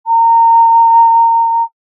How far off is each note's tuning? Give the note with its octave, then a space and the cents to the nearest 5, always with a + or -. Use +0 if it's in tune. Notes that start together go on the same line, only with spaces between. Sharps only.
A#5 -25